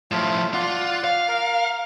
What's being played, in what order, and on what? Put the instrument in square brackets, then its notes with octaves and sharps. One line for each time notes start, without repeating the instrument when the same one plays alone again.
[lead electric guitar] A2 F3 [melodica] A3 F4
[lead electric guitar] F4 [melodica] D5 F#5
[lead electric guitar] F5
[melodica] A#4